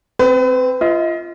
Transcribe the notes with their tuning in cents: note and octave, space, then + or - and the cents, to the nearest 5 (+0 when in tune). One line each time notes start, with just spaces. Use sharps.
C4 +0 B4 +35
F4 -25 D#5 +30